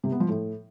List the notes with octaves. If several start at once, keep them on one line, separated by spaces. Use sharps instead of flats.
C3
B3
F3
A2